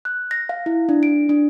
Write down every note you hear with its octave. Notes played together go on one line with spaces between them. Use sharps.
F#6
A#6
F5
E4
D4
D7
D4